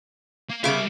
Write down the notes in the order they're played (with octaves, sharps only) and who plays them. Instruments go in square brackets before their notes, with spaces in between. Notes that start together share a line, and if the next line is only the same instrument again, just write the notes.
[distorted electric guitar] A#3
[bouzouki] C#3 B3 G4 [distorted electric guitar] G3 E5 [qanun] F5 D6